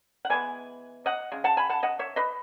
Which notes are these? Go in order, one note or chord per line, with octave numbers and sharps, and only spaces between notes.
F#5
E3 G#3 B3 G#5
D#5 F#5
C#3 G#3
F#5 A5
G#5 B5
F#5 A5
D#5 F#5
C#5 E5
B4 D#5